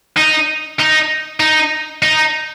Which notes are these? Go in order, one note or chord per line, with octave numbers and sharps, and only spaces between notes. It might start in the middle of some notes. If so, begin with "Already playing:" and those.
D#4
D#4
D#4
D#4